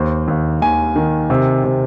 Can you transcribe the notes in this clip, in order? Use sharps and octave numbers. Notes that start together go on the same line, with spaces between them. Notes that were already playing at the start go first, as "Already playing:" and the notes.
Already playing: D#2 C5
D#2
D#2 G#5
D#3
C3
C3